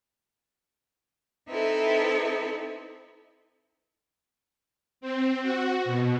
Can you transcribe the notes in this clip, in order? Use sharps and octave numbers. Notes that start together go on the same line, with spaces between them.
C4 D#4 E4 A4 B4 E5
C4
F#4
B2